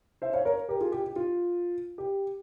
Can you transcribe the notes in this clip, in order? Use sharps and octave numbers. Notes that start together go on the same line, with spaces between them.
C5 E5
C#5 F5
A#4 C#5
G4 A#4
F4 G#4
G4
G4
F4
G4